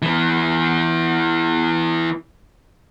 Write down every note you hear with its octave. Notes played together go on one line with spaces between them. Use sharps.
E3 B3